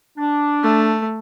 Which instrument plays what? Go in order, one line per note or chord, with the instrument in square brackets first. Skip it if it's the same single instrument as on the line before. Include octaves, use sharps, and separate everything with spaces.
[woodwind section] D4
[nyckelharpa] A3